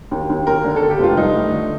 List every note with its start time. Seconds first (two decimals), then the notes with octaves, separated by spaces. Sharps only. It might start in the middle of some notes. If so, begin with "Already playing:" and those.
0.11 D#2
0.30 D#2
0.47 D#2 A#4
0.65 D3
0.76 A4
0.83 D#2
0.90 G4
0.99 F1 F4
1.17 G2 D#4
1.35 A3
1.52 D3